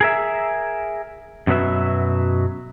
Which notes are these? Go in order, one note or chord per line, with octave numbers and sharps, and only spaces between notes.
G#4 A#4 E5
F#2 B2 F#3 B4 E5